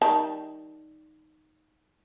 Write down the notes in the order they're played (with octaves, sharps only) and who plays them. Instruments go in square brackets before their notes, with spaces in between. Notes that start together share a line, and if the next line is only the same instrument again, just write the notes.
[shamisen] D#3 G3 A5